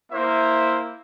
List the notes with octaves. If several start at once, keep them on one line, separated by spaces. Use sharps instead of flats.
A#3 E4 C5 E5